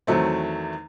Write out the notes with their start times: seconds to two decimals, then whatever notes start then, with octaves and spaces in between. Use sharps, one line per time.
0.07 E2 D#3 F#3 A3 C4